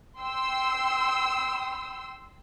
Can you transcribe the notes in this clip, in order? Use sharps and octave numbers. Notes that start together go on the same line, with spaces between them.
G5 C6 E6